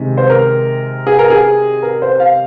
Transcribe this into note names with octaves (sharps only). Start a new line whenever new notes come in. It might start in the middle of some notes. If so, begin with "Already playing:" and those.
Already playing: C3 D#3 G#3
C5
A#4
G#4
A#4
G#4
A#4
C5
F5